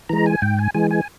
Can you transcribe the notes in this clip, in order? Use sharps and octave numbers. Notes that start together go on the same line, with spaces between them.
E3 G#3 A#5
G#5
G#2 G5
G#5
E3 G#3 G#5
G#5